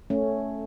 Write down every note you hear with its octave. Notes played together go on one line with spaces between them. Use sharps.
A3 C#4